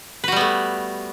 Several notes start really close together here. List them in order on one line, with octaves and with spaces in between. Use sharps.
B4 F#4 G3 B3 A3